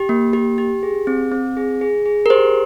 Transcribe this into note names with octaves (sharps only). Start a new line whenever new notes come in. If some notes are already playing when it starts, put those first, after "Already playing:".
Already playing: G4
A#3
G4
G4
G#4
C4
C4
G#4
G#4
G#4
A#4
G4 C5